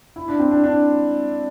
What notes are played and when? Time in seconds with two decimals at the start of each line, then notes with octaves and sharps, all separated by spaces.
0.16 E4
0.28 D4
0.40 C4
0.51 D4
0.64 D4